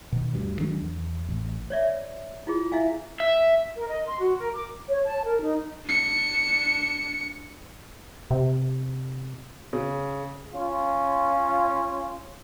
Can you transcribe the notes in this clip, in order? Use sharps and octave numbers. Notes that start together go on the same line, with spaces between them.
B2 D#3
D2 G2
D#3 F#3 G#3 D4
E2
A1
C#5 D5 E5
E4 F4 G#4
E4 E5 F5 G#5
E5
A#4
D#5
C6
F#4
A#4
D6
C#5
A5
A#4
D#4
D4 C#7
C3
C#3
C#4 F4